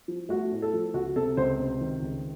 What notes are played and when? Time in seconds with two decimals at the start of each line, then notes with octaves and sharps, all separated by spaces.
0.08 F3
0.29 A3 F#4
0.52 A2
0.62 A4
0.73 F3
0.94 C#2 F#4
1.16 C3 A4
1.37 C#2 C5
1.59 C3
1.81 D#3
2.02 C#2